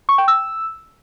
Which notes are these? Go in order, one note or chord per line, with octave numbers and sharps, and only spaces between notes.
C#6
G5
E6